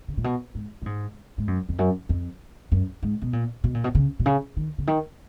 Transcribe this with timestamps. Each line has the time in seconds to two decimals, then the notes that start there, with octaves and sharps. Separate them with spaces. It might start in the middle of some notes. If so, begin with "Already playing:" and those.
0.08 C#3
0.17 A#2
0.24 B2
0.55 G#2
0.82 A#2
0.86 G#2
1.38 G#2
1.47 F#2
1.69 F2
1.78 F#2
2.09 F2
2.72 F#2
3.03 G#2
3.22 B2
3.33 A#2
3.64 B2
3.74 A#2
3.84 B2
3.95 C#3
4.19 B2
4.26 C#3
4.57 D#3
4.78 C#3
4.87 D#3